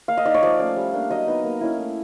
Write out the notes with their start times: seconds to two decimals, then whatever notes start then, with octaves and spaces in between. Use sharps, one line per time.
0.08 A#3 F5
0.17 D#5
0.26 D#4 D5
0.34 C#5
0.43 F3 D5
0.59 A3 C#4
0.76 G3
0.94 A#3 D4
1.10 F#3 D#5
1.27 B3 D#4
1.44 A#3
1.61 C#4 E4
1.78 A3